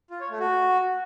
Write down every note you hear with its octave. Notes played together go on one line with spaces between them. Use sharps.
F4
C#5
A3
F#4